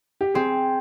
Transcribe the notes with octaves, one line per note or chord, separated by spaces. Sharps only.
G4
C4 G#4